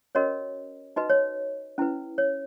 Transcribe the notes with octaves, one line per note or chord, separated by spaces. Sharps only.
C#4 F#4 A#4 C#5 D#5
D#4 F#4 B4 D#5
C#5
C#4 E4 B4
C#5